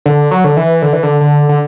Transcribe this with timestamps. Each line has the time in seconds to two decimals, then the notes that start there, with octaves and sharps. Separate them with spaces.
0.06 D3
0.31 F#3
0.44 D3
0.57 E3
0.82 D3
0.93 E3
1.03 D3
1.21 D3
1.49 D3